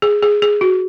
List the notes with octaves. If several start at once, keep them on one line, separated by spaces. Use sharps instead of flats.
G#4
G#4
G#4
F#4